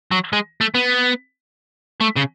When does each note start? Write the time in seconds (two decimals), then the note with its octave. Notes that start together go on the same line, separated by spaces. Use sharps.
0.11 F#3
0.33 G#3
0.61 A3
0.75 B3
2.01 A3
2.17 C#3